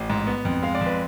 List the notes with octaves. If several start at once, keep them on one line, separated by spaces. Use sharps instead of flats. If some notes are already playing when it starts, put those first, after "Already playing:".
Already playing: A1
G#2
B3
F2
G#3 F5
D5
F2
B4